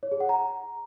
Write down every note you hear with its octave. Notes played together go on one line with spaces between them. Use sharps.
C#5
G#4
F#5
A#5